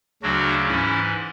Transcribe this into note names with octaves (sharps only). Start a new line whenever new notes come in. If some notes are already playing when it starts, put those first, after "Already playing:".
D2 C#3 F#3 D4 F#4
G#2 E3 C#4 E4